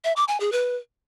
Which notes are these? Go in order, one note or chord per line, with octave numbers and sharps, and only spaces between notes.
E5
D6
G#5
G#4
B4